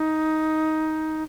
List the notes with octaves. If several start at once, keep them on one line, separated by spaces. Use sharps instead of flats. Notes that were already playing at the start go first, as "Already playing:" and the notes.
Already playing: D#4